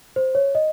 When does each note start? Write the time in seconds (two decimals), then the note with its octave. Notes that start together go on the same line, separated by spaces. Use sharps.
0.16 C5
0.35 C#5
0.55 D#5